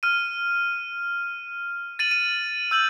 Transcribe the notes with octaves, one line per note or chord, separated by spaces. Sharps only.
F6 D#7
A6 D#7 F#7
D#7
E6 G6 F#7